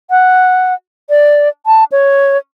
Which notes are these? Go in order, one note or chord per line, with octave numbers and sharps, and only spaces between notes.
F#5
D5
A5
C#5